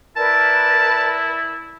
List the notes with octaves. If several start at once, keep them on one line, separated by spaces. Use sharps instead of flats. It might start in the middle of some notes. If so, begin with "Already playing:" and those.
E4 A#4 B4 D5 A5